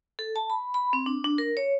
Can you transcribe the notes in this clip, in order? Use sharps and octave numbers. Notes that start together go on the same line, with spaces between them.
A4
A5
B5
B5
C4
D4
D4
A#4
C#5